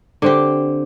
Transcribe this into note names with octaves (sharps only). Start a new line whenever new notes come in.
D3 C4 G4